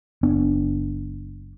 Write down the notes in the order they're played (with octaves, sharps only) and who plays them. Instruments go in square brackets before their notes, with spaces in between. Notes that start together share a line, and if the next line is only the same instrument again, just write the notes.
[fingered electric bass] F#1 B3 D4